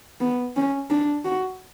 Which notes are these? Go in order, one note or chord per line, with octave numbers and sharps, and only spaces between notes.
B3
C#4
D4
F#4